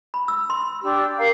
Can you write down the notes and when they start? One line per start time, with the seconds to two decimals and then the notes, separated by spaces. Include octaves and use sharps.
0.14 B5
0.28 E6
0.50 C6
0.82 D4 G4 E6
1.18 A#4 F5 A#5